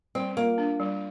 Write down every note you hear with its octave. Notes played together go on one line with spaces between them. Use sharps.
G3 C4
A#3 F4
D4
G3